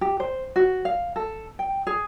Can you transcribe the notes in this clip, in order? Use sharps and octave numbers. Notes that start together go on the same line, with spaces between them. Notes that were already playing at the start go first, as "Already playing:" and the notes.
G4
C5
F#4
F5
A4
G5
G#4